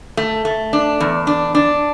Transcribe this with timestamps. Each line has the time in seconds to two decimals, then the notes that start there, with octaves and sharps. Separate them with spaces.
0.17 A3
0.45 A3
0.73 D4
1.00 E2
1.27 D4
1.55 D4